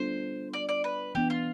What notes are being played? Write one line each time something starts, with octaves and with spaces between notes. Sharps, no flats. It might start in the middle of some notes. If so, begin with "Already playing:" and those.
Already playing: G3 B3 D4 F4 A4 C5
D5
D5
B4
E3 B3 D4 G4
F4